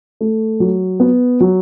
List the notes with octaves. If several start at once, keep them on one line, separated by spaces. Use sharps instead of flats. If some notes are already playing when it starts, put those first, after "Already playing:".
A3
F#3
B3
F#3